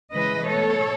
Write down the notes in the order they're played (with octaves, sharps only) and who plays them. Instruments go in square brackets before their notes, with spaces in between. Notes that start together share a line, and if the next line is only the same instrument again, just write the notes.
[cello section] C#3 E3 G#3 B4 D#5
B2 A3 A4 C#5